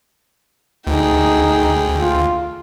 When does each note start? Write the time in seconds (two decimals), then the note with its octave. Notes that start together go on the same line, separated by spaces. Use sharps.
0.87 D2 D#4 G#4 G5
2.00 F4